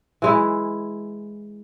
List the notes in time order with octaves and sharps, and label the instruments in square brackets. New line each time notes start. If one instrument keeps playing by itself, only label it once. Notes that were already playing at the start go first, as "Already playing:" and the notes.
[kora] E3 G#3 E4